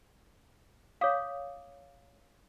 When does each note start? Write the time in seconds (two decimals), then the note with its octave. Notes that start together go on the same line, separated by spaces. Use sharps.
1.01 C#5 F5 D6 D#6 B6